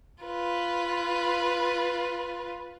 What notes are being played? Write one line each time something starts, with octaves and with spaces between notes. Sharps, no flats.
F4 B4